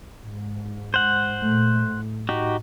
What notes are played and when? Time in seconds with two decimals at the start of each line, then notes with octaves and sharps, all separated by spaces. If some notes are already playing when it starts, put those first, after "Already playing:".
0.22 G#2
0.94 C5 F#5
1.42 A#2 A3
1.88 A2
2.29 D#4 F#4 G4